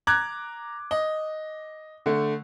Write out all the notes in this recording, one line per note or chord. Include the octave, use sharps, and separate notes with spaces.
A#5 D6 F#6 G#6
D#5
D3 A3